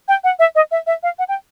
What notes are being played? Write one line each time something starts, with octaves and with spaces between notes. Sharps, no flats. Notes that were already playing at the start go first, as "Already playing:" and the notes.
G5
F#5
E5
D#5
E5
E5
F5
F#5
G5